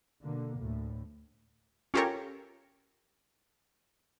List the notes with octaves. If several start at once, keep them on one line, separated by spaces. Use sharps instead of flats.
B2 D3 A#3
D2 A2
C#4 F4 G4 A4 A#4 C#5